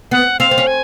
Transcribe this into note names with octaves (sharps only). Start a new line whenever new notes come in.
B3 F#5
C4 F5
C4
C#4
G#5